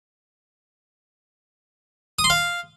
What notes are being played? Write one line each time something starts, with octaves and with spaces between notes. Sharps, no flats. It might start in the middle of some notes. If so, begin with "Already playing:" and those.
D#6
C6
F5